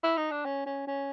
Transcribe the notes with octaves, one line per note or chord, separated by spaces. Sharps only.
E4
D#4
D4
C#4
C#4
C#4